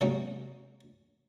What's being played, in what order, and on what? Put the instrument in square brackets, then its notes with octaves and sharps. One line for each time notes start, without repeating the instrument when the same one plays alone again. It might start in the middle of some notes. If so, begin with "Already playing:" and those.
[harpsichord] C3 F#3 G#3 A#3 C#4 D#4